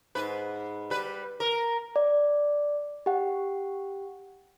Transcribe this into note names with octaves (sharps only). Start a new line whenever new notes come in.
G#2 B4
G3 B4
A#4
D5
G4 F#5